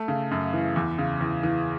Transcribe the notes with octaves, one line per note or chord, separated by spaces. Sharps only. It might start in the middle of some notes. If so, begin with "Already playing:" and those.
Already playing: A3
C#3
F#2
E3
E2
C#3
E2
E3